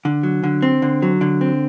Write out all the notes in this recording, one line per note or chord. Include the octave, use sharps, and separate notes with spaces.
D3
F#3
D3
C4
D3
F#3
D3
C4